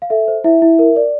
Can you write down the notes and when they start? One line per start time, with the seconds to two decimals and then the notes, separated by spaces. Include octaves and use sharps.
0.02 F5
0.10 A4 E5
0.28 C5
0.44 E4 E5
0.62 E4
0.79 A#4
0.96 D5